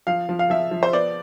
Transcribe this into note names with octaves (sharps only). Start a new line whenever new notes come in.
F3 F5
F3
F5
F3 E5
F3
C5
B3 D5